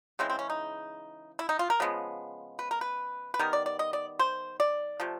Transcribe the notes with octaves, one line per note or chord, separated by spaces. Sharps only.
C#3 E3 G#3 C4
C4
C#4
D#4
E4
D#4
F4
A#4
C#3 F3 G#3 B3
B4
A#4
B4
B4
D#3 G3 B3 A#4
D5
D5
D#5
D5
C5
D5
C3 F3 A3